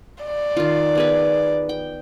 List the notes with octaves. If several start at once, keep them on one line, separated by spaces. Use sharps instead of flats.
D5
D#3 F4
B3 G#4 B4
G5